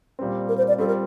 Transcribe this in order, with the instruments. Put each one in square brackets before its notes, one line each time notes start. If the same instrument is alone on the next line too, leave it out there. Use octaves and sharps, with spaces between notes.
[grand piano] A#2 G3 C4
[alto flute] A#4
C5
D5
[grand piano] G3 C4 F4 [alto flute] A4
[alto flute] A#4